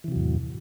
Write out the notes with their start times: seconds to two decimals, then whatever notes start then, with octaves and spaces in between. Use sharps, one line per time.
0.04 E3
0.08 C3
0.12 F#3
0.16 E2
0.20 A2